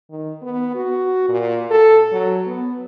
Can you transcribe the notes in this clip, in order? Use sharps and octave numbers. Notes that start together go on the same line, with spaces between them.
D#3
B3
F#4
A#2
A4
F#3
B3